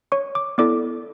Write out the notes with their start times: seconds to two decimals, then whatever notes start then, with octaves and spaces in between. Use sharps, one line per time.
0.12 C#5 C#6
0.35 D6
0.58 B3 E4 A4 D5 D6